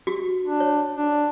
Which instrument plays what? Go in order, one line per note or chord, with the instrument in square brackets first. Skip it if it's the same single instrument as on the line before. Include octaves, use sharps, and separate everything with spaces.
[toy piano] F#4 G4
[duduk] D4
[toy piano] C#5
[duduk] D4